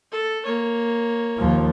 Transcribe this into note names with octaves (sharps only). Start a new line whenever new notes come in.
A4
A#3 C#5
D#2 F3